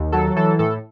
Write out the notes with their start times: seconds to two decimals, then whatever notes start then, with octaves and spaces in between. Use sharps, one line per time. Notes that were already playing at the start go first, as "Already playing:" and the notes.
Already playing: D#2
0.12 F#3 A4
0.36 E3 A4
0.59 A2 A4